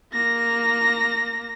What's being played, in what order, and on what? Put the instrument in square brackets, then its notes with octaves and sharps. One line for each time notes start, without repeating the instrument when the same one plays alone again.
[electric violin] A#3 A#6